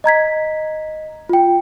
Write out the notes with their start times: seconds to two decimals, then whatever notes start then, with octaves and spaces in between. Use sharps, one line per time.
0.04 D#5 A#5 G#6 B6
1.29 F4 G5